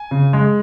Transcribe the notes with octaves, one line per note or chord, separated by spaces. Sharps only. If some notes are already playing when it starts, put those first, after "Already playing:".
Already playing: G#5
C#3
G#3